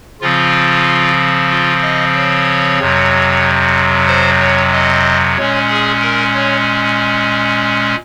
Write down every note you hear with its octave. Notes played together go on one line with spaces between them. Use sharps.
C#3 F3 C4 F4
F4
D#5
C#5
F2 C3 F#3
C5
C#5
D#5
A#2 G#3 C#4 C#5
G#4
A#4
C#5